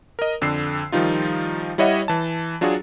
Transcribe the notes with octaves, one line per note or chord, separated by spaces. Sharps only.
A#4 D#5
F2 D3 E6 C7
D#3 F3 G3 D#4 F4
G3 E4 C#5 D#5 E5 F#5
E3 A5
F#3 D4 F4 F#4 G#4